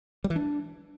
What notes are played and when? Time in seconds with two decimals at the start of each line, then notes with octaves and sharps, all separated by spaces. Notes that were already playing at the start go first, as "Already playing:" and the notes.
0.24 G3
0.30 E3
0.36 D4